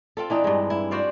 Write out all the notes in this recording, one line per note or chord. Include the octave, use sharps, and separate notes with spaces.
C4 F4 A4
E3 D4 D#4
G2 G#3
E4
F#4 C5 D5 F5